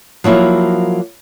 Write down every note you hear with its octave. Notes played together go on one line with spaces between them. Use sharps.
F3 F#3 A#3 E4